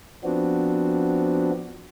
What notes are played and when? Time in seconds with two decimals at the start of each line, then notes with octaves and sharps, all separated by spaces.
0.24 F3 B3 C4 D4 F#4